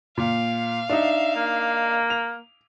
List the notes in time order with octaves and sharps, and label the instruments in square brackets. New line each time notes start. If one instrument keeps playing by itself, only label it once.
[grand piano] A#2 [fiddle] F5
[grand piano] D4 D#4 [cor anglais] E5
[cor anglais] A#3
[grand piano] F7